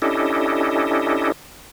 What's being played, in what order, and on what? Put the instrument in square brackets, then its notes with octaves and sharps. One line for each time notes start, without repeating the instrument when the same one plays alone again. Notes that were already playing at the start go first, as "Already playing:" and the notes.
[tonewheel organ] C#4 D4 E4 G4 A4 D#5